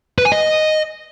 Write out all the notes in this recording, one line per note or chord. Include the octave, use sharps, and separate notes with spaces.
B4
G#5
D#5